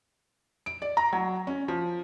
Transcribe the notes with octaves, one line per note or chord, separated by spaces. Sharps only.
D7
D5
A#5
F#3
C#4
F3